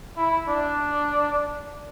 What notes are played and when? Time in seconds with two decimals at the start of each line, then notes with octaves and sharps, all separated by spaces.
0.17 E4
0.48 D4